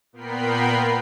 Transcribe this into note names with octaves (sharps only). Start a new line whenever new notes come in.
A#2 B3 A#4 G5 B5 C7